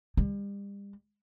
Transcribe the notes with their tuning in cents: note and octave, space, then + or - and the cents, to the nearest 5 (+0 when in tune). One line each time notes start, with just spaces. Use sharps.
G3 +40